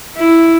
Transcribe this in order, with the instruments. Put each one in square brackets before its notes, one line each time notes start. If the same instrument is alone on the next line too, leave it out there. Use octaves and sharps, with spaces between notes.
[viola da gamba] E4